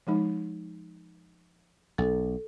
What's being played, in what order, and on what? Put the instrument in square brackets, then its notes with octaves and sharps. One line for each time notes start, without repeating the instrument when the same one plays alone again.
[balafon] F3 G#3 D#4
[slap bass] B1 [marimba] A4